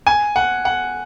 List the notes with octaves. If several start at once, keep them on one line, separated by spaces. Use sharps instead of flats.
G#5
F#5
F#5